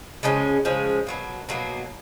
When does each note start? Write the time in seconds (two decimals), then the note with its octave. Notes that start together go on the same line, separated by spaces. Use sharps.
0.23 C#3 F3 G#3 C#4
0.65 C#3 F3 G#3 C#4
1.07 B2 F#3 A#3
1.49 B2 F#3 A#3